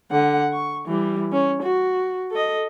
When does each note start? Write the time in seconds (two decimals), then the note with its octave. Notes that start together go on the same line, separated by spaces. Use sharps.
0.11 D3 F#5
0.53 C#6
0.87 E3 G3
1.32 C#4
1.62 F#4
2.31 A4 D#5